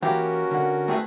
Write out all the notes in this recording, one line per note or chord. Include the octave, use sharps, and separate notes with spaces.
E3 A#3 C#4 F#4 G4 A#4
D3 F#5
A3 C4 G#4 B4